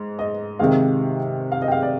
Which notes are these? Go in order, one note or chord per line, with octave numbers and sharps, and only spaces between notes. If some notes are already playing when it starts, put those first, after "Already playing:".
Already playing: G#2
D#5
C3 D#3 G#3 F5
F5
D#5
G5
F5
D5